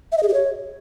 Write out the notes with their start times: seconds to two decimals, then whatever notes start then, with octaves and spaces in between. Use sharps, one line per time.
0.12 E5
0.17 D#5
0.23 G#4
0.28 G4
0.34 C#5